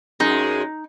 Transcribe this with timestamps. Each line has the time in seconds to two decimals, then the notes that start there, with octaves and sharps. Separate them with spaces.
0.20 F#2 G#3 D#4